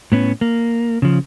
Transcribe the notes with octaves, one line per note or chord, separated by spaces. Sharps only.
A2 B3 C#4
A#3
C#3 F3